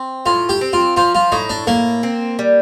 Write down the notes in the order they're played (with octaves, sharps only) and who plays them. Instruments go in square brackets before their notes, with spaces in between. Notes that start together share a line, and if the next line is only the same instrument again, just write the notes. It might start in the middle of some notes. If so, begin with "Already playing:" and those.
Already playing: [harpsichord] C4
[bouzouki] A2 [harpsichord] F4
[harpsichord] G4
[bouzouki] C4
[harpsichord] F4
[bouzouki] F3 [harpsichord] F4
[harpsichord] F4
[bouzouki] A2 [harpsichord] D#4
[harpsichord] D4
[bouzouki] A2 [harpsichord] A#3
[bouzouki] C4
G3